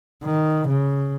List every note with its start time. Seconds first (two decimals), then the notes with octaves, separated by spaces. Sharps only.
0.25 D#3
0.69 C#3